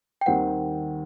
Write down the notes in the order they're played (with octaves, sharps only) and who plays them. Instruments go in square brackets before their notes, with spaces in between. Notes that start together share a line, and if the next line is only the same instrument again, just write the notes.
[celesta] G5
[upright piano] D#2 D#3 G3 C4 [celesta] F#5